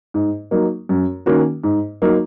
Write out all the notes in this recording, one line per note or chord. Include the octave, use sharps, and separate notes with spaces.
G#2
F#3 A#3 D#4
F#2
D#3 A#3 C#4 F#4
G#2
F#3 A#3 D#4